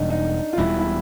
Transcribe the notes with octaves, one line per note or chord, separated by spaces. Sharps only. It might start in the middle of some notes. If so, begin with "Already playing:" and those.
Already playing: E1 E2 B2 G3 D4 D#4
D#4
F4
E1 E2 B2 G3 E4
E4